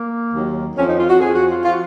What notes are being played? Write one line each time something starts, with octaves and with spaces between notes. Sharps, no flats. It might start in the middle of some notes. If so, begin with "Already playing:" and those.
Already playing: A#3
D#2 D#3 F#3
F2 F3 C#4
D#4
F4
F#4
F2 F3 G#4
F#4
F4
F3 F4
F#4